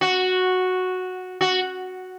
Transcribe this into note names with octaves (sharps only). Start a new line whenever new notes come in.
F#4
F#4